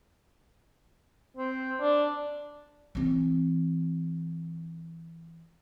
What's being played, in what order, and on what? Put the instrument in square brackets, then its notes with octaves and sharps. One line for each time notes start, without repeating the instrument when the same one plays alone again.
[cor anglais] C4
D4
[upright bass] E3 C4